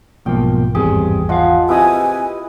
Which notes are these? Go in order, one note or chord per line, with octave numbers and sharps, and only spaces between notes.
B1 G#2 B2 F3 A#3 G5
G#1 E2 G2 E3 C4 G4 G#4
F3 D#5 F5 F#5
C4 E4 G4 B4 D#5 G#5 D#6